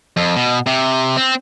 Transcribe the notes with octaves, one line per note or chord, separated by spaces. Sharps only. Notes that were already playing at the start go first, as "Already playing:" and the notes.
F2
B2
C3
C4